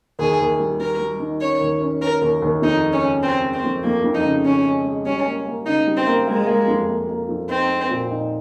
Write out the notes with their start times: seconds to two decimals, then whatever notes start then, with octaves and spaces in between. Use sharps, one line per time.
0.19 D#2 G#4
0.39 D#2
0.59 G3
0.79 G3 A#4
1.00 G3
1.20 D#3
1.40 C#4 C#5
1.61 D#2
1.81 C#4
2.01 C#4 A#4
2.21 D#2
2.42 D#2
2.62 F2 D#4
2.83 G#3
2.93 C#4
3.03 C#3
3.23 G#3 C4
3.43 G#3
3.53 C4
3.64 F2
3.83 F2 A#3
4.04 F2
4.14 D#4
4.24 C#3
4.44 C#3 C#4
4.65 G#3
4.85 G#3
5.05 G3 C#4
5.26 A#3
5.46 A#3
5.66 C#3 D#4
5.87 G3
5.97 C4
6.07 A#3
6.27 G#3 A#3
6.47 A#3
6.68 F2
6.88 A#3
7.09 A#3
7.29 F2
7.48 C4 D#4
7.69 G#3
7.89 A#2
8.10 D#4